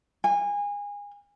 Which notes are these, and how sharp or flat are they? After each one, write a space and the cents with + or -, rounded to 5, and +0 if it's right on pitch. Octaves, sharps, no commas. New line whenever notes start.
G#5 -25